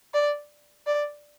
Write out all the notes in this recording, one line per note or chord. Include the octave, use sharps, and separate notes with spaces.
D5
D5